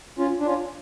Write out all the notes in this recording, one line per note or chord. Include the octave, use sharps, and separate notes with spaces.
C#4 F4
D4
C#4 F4